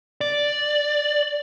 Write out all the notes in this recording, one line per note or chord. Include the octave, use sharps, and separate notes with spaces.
D5